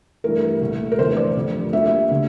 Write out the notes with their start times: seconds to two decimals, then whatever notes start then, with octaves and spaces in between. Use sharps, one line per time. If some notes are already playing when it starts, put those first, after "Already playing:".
0.24 G2 E3 A3 A#4
0.61 C2 A#2 A3
0.92 A#4
0.98 F1 E2 D3 C5
1.17 D5
1.36 F1 F2 D3 G3
1.73 D2 D3 G3 A#3 E5
2.10 D3 A3